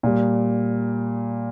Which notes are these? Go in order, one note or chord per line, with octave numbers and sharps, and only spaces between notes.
A#2 G3